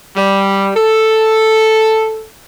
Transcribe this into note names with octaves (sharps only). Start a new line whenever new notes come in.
G3
A4